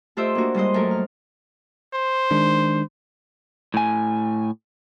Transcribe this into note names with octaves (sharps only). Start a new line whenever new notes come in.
A3 F4 G4 C5 D#5 E5
A#3 D4 F#4
G3 G#3 C5 D#5
F#2 A3 A#4
F6
C5
D#3 G#3 D4
A2 G#5